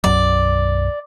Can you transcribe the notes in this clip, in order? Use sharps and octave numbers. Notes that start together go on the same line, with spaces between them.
B1 F#2 F#3 D5